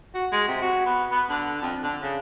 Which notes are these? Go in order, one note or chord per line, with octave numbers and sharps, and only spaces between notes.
F#4
G#3
C3
F#4
B3
B3
D3
F2
D3
C#3